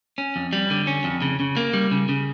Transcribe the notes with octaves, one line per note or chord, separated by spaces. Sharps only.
C#4
F2
G3
D3
C#4
F2
C#3
C#3
A#3
G3
C#3
C#3